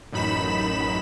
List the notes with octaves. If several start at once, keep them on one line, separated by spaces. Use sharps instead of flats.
A1 F#2 D#4 B5 B6 E7